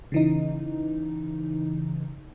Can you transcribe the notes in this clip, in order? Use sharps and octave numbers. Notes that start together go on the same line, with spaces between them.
C#3 E3 D#4